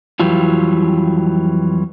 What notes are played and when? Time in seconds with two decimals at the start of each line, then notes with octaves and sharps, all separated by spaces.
0.20 F2 E3 F#3 G3 F4